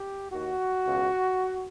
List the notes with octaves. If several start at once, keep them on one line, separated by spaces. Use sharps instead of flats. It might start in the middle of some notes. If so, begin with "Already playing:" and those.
Already playing: G4
D#2 D#3 F#4
C#2 B2